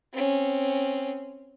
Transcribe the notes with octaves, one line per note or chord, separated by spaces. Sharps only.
C4 C#4